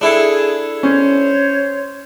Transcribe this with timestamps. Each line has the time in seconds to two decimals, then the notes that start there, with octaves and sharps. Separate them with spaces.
0.01 D4 E4 G#4 A4
0.83 C#4 C5 C#5